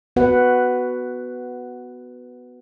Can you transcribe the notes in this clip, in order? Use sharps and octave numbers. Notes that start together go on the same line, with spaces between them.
B3 F#4 B4 F#5